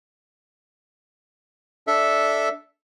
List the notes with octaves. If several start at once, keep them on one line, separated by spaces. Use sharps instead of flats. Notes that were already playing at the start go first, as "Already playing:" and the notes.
D4 A4 E5